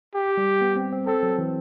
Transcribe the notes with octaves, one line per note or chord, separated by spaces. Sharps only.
G4
G3
B3
C4
C4
C4 A4
F#3
E3